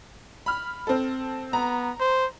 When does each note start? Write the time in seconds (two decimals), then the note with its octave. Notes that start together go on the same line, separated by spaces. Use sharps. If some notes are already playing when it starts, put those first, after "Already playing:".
0.46 B5 F6
0.87 C4 A4
1.53 B3 A#5
2.00 C5